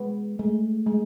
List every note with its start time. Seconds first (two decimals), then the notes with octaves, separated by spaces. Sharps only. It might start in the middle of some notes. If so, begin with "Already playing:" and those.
Already playing: G#3 B3
0.39 G#3 A3
0.87 G#3